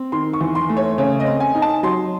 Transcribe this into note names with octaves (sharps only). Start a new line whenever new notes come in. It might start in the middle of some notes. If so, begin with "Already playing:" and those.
Already playing: C4
D#3 C6
C#6
E2
C6
A3
C#5
C#3 C#5
D#5
C4
G#5
D#4
A5
F#3 C6